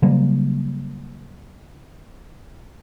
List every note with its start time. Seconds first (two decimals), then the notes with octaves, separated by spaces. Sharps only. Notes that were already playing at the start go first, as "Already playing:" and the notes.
0.02 C#3 F#3 G3 A#3